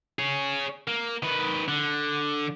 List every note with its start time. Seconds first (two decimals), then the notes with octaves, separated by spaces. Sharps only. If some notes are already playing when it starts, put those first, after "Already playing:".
0.19 G#4 C#5
0.87 A#3
1.23 D#3 B4
1.68 D3